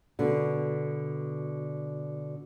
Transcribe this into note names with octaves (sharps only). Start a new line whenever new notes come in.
B2 D3